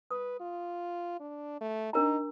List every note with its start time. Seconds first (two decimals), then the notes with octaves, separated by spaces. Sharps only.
0.11 B4 D#6
0.40 F4
1.20 D4
1.61 A3
1.93 D4 D#4 A#4 A#5